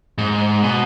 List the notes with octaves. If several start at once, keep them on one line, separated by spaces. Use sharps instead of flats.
G#2
B2